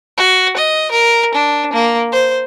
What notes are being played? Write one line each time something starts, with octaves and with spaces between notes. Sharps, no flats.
F#4
D#5
A#4
D4
A#3
C5